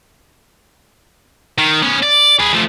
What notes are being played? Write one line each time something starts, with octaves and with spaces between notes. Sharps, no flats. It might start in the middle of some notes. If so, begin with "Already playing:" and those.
D#3
B3 C#4
D5
G#4 B4
F3 A3